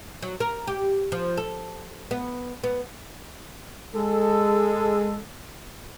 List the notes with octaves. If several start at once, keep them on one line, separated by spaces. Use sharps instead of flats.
F#3
A#4
G4
F3
A4
B3
B3
G#3 A4